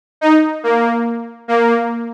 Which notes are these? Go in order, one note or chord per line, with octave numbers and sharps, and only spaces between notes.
D#4
A#3
A#3